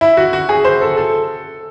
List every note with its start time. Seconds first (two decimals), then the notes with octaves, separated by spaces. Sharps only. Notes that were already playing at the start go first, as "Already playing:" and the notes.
0.01 E4
0.17 F#4
0.33 F#4
0.49 G#4
0.65 C5
0.81 A4
0.97 A4